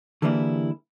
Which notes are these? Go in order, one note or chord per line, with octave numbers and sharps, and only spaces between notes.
D3 E3 G3 A#3 E4 G#4